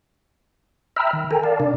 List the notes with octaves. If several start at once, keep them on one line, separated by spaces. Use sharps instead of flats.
E5 G5 A#5 B5 E6 F6
D#3
A4 A#4 G5 G#5 A#5
A#4 D5 F5 A5
C3 D4 D5